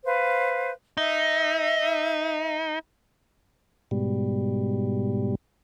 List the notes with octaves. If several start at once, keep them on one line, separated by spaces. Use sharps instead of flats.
B4 C5 F5
D#4 E5
G#2 B2 G3